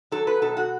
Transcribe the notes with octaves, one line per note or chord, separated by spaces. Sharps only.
F#3 A4
B4
B2 A4
F#4